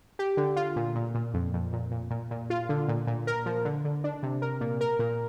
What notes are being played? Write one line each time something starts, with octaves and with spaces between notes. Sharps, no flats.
G4
D3
F4
A#2
A#2
A#2
F2
F2
A#2
A#2
A#2
A#2
F4
D3
A#2
A#2
A#4
F3
D3
D3
D4
C3
A#4
A#2
A#4
A#2